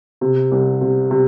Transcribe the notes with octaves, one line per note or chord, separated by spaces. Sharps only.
C3
C2
C3
C3